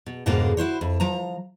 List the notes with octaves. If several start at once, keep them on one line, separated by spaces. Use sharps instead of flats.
B2
F2 G#2 B2 D3 G#3 A#3
E4 F#4 C5 C#5
F2
F3 A#5